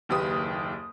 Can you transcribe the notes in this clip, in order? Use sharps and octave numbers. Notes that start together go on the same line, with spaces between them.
F#1 D#2 G4 B4 D#6